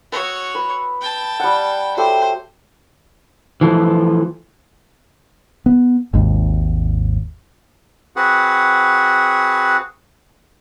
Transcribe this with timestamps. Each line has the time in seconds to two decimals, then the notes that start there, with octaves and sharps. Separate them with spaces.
0.12 F#4 C#5 D#6 E6
0.55 B4
1.01 G5 A5
1.40 G3 F#5
1.97 F#3 A3 G4 C5
3.61 E3 F3 A3
5.66 B3
6.13 G#1 D#2 G#2
8.16 C4 F#4 G#4 B4 F#5